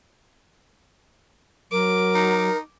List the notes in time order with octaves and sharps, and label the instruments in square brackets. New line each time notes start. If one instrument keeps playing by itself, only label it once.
[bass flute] F#3 [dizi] A#4 [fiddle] D6
[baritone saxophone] D#4